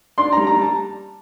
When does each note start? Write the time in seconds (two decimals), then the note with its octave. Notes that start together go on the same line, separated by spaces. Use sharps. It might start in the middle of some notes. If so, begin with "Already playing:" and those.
0.18 D4 C6
0.32 G3 A#5
0.47 A#5
0.56 G3
0.62 A5